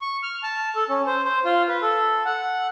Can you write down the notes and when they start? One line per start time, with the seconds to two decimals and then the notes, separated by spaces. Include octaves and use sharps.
0.01 C#6
0.23 F6
0.43 A5
0.76 A4
0.89 C#4
1.07 C5
1.25 C5
1.45 F4
1.68 B4
1.82 A4
2.25 F#5